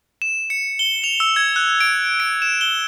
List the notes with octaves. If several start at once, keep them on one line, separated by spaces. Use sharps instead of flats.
E7
C#7
G7
F7
E6
G#6
F#6
D7
D7
E7
G7